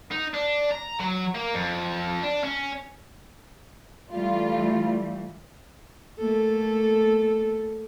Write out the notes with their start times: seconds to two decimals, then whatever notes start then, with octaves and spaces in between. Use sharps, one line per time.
0.12 D#4
0.34 D4
0.71 A#5
1.00 F#3
1.35 A#3
1.54 F2
2.23 D4
2.44 C#4
4.12 E3 G3 A3 F4
6.19 A3 A#3 A4